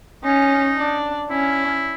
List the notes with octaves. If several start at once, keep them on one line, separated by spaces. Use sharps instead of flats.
C#4 D#4
D4
C#4 E4